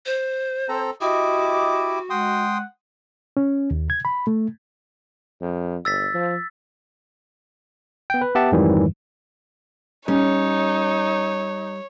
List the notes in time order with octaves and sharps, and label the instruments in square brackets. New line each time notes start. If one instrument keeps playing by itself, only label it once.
[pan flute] C5
[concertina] C4 A4 A#5
[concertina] E4 G4 D6 [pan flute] F#4 [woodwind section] D#5 D#6
[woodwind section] G#3 F#5 [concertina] G5 C6 D#6
[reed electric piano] C#4
D#2
G#6
B5
A3
[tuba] F2
[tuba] G1 [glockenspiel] E6 A6 B6
[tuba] F3
[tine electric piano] B3 G5
B4
B3 G4 E5 F#5 A5
F2 G#2 D#3 E3 F#3 G3
[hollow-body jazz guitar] G3 [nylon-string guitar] C#4 [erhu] D#4 [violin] C#5